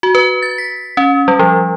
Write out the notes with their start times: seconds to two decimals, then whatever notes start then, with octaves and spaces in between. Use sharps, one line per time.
0.03 F#4
0.15 B4
0.42 A6
0.58 B6
0.97 C#4
1.28 G3
1.39 F3